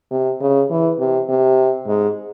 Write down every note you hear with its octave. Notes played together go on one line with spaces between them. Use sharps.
C3
C#3
E3
C3
C3
G#2